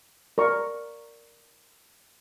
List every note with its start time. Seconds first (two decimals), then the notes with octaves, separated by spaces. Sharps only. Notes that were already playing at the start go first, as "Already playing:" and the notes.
0.38 A#4 D5 C#6